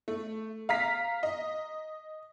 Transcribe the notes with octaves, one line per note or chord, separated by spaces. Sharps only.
A3
F5 A#5 B6
D#5